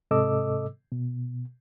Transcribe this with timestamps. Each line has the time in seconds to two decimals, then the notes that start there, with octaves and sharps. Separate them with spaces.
0.11 G#2 C3 A4 D#5 D6 E6
0.92 B2